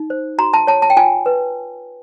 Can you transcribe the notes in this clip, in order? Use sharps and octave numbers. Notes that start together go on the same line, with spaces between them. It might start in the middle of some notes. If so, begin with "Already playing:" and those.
Already playing: D#4
C5
F#4 A#5
A5
C#5 A5
A5
G5
F4 G#5
B4